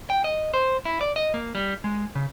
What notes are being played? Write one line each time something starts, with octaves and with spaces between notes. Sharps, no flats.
G5
D#5
C5
E4
D5
D#5
A#3
G3
G#3
C#3